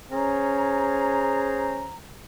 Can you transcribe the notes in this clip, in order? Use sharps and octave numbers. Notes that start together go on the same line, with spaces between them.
C#4 G#4 C5 A#5